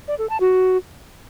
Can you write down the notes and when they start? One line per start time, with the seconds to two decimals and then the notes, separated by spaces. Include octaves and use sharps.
0.08 D5
0.19 A4
0.30 A5
0.40 F#4